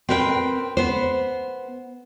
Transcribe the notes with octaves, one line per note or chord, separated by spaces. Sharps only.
C4 A#4 B4 F5 G5
B3 C5